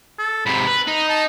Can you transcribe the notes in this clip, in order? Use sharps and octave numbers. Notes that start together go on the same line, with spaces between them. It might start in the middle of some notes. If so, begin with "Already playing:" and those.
A4
G#2 C3 B5
B4
D#4 D#5
A5